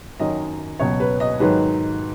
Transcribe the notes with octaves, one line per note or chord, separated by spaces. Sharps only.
F#2 D#3 F#3 D#5
C#2 B2 F#3 C#5
B4
D#5
G#2 D#3 F#3 B4